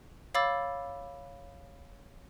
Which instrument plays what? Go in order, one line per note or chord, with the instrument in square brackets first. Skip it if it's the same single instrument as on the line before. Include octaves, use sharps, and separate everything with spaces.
[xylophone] C#5 F5 B5 D6 E6 A6